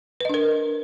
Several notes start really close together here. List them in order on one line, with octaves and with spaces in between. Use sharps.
B4 D#5 D4 A#4